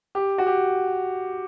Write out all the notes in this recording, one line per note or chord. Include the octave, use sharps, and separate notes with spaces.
G4
F#4
G4